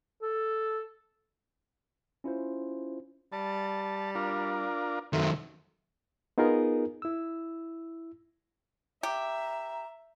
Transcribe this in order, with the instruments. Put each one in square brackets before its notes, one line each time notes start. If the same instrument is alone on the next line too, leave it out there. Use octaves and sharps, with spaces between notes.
[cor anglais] A4
[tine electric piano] C#4 E4 F4 C5
[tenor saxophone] G3 [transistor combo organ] A5
[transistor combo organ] D4 F4 A#4
[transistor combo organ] F#2 C4 [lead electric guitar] D#3 F#3 [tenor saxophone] A3
[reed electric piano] B3 D#4 F4 G#4 A#4
E4 E6
[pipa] G4 [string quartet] E5 [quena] A#5